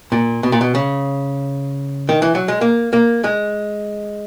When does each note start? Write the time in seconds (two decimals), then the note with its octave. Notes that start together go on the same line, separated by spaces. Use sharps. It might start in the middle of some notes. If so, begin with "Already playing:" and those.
0.12 A#2
0.43 B2
0.52 A#2
0.61 B2
0.75 C#3
2.09 D#3
2.22 E3
2.35 F#3
2.48 G#3
2.61 A#3
2.93 A#3
3.24 G#3